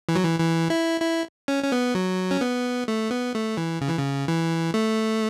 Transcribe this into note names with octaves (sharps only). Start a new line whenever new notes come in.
E3
F#3
E3
E3
E4
E4
C#4
C#4
B3
F#3
C#4
B3
A3
B3
A3
E3
C#3
E3
C#3
E3
A3